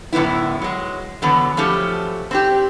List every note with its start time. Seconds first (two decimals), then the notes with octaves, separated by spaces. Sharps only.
0.12 F#2 A2 D3 B3 E4
0.62 F#3 G#3
1.22 D3 E3 F#3 B3
1.57 F3 F#3 A3 C#4 G4
2.31 C4 D4 G4